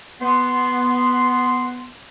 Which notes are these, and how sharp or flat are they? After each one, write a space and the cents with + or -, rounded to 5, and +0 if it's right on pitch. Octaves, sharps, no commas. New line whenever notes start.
B3 +0 B4 +0 C6 -10